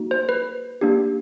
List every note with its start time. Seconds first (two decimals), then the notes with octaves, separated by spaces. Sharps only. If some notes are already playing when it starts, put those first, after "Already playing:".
Already playing: A#3 D#4 F#4
0.11 C5
0.29 B4
0.81 A#3 D4 G4